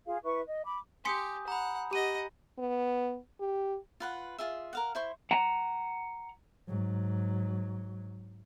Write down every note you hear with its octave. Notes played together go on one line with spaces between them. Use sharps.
F4 G#4 F5
E4 B4 E5 C#6
D#5
B5 D6
G4 G#5 C6 D#6 G6 B6 C#7
F#5 A#5 B5
G4 D#5 F#5 D#7
B3
G4
F4 B4 F#5
F4 G#4 E5
A#4 F5 F#5
E4 C5 C#6
F#5 A#5
G#2 F#3